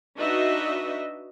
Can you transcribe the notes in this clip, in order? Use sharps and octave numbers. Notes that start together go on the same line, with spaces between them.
D4 D#4 F#4 B4 D#5 E5